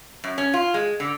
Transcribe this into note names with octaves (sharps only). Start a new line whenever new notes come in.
F#2
C#4
F4
G#3
D3